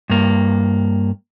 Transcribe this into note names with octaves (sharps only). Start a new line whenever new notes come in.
G2 A#3